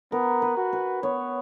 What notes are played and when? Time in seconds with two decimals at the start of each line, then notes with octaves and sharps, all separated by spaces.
0.12 B3 A#4
0.42 B4
0.57 F#4
0.73 B4
1.03 B3 C#5